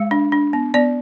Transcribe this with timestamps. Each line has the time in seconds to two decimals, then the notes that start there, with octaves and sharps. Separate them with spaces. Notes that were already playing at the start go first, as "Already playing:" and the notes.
Already playing: G#3 F5
0.11 D4
0.32 D4
0.53 B3
0.74 B3 D5